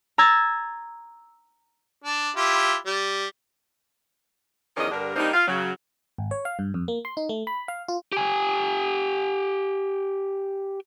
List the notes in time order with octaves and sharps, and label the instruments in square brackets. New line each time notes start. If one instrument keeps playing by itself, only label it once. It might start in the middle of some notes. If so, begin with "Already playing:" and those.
[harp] A#5 E6 G#6 A6
[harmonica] D4
E4 F4 G4
G3
[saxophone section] E2 D#3 F3 C#4 D5 D#5
G2 D3 G3 D4 A#4
G3 A#3 C4 D4 D#4
F4 F5
C#3 F#3
[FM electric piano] G#1
C#5
F5
G2
F2
A#3
C6
D#4
A3
B5
F5
F4
[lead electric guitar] G4 G#5